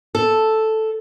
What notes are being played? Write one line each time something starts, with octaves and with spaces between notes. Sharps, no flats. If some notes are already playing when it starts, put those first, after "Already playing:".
A4